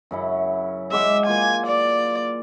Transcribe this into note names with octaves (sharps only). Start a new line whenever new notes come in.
F#2 C#3 E4
G#3 E5 F#5 D6
A#3 F4 G#5
D5